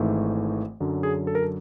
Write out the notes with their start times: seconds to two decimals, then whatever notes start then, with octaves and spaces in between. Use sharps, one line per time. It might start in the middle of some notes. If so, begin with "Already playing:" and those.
Already playing: G#1 G#2 E3 A3
0.80 F#2 D3 F#3
1.03 G#4
1.27 A4
1.35 A#4
1.42 A4